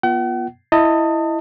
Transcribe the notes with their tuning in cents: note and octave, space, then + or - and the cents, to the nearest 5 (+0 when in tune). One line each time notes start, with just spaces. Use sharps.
B3 -35 F4 -10 F#5 +45
E4 +5 D#5 +0 A5 +35